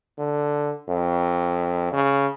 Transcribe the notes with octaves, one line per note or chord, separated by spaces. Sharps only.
D3
F2
C#3